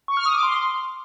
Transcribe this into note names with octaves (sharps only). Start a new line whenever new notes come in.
C#6
F6
D#6
D6
C6